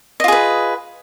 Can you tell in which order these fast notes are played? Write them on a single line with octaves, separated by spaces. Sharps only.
D#5 F4 G#4 B4